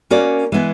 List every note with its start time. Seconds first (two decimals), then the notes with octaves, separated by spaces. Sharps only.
0.10 A#3 C#4 F#4 A#4 D5
0.52 E3 G#3 B3 E4